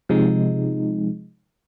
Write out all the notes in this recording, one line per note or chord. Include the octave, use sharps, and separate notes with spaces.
C3 F3 G#3 D#4